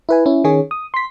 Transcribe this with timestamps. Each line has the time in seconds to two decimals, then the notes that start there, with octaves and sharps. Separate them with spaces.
0.09 E4 B4 G#5
0.26 C#4 E4
0.44 D#3 C#4 G#4 C#5
0.71 D#6
0.94 C6 B6